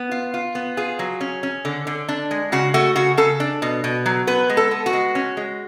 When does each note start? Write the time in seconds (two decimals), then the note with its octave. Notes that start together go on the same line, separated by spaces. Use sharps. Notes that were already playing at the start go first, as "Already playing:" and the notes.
Already playing: B3
0.11 F4
0.34 F4
0.55 B3
0.77 F4 G#4
0.99 F#3
1.21 C#4
1.43 C#4
1.65 D3
1.87 D3
2.09 D4
2.31 G#3
2.52 C#3 F#4
2.74 A3 F#4
2.96 C#3 F#4
3.17 C#3 A4
3.40 D4
3.62 B2
3.84 B2
4.06 F#3
4.27 B3 B4
4.49 G#3
4.57 A4
4.71 B3
4.86 F#4
4.93 G#3
5.15 C#4
5.37 G#3